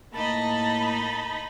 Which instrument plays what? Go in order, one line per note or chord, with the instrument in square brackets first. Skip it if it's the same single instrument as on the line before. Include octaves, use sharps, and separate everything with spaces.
[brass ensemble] A2 A#3 [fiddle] D#4 D#5 [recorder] A5 [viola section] B5